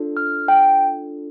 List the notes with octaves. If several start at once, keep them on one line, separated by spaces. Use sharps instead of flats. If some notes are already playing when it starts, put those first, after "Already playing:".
Already playing: D4 F4 A4
F6
G5